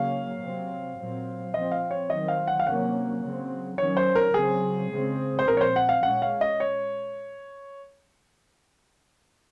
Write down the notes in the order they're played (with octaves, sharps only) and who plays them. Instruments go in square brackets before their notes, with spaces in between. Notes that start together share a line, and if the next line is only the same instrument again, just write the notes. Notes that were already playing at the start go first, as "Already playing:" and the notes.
Already playing: [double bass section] C#3 F#3 A#3 C#4 [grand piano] F5
[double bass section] C3 F#3 C4
A#2 F#3 C4
[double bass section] F3 C4 [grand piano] D#5
[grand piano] F5
C#5
[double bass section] D#3 F#3 C4 [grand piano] D#5
[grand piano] F5
F#5
F5
[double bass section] C3 F#3 A#3 C#4 [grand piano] F#5
[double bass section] C#3 F#3 C4
[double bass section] D#3 F#3 C#4 [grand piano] C#5
[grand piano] C5
A#4
[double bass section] C#3 F#3 C4 [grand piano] G#4
[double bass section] C#3 G#3 C4
[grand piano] C5
[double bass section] A#2 F3 C4 [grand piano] A#4
[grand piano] C#5
C5
F#5
F5
[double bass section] A#2 G#3 C#4 [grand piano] F#5
[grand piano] F5
D#5
C#5